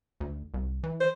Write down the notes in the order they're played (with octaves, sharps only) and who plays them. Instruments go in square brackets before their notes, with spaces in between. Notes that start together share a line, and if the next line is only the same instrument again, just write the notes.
[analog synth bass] D2
C2
E3
[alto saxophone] C5